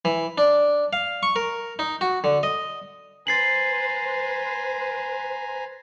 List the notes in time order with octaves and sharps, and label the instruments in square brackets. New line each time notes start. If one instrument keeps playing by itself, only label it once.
[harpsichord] E3
D4
F5
C#6
A#4
D#4
F#4
D3
D#5
[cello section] B4 C5 [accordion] G#5 A#5 [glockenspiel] A6 C7 F#7